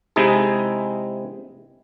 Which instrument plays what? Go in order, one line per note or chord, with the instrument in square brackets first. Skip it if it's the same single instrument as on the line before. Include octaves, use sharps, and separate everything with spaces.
[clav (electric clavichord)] C3 G#3 D#4 E4 G#4